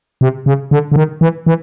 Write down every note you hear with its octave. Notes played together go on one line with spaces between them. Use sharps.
C3
C#3
D3
D3
D#3
E3
E3